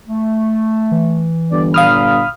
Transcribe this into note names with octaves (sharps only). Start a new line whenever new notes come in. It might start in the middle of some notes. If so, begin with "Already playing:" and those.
A3
E3
G1 D5
A#2 F5 B5 D#6 F6